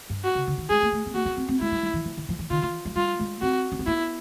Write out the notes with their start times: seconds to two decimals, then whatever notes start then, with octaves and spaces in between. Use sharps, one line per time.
0.10 G2
0.24 F#4
0.35 C#3
0.47 D3
0.58 D#3
0.69 G#3 G#4
0.82 A#3
0.92 A3
1.06 B3
1.14 A#3 F#4
1.26 B3
1.37 C4
1.48 C4
1.60 G#3 E4
1.72 G3
1.83 G3
1.94 E3
2.05 F3
2.17 D#3
2.29 F3
2.39 E3
2.50 D#3 F4
2.63 E3
2.85 F#3
2.96 G3 F4
3.19 G#3
3.41 C4 F#4
3.72 C#4
3.79 C4
3.86 B3 E4